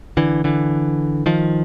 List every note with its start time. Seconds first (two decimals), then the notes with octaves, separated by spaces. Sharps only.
0.17 D3 E3
0.44 D3 E3
1.26 D#3 F3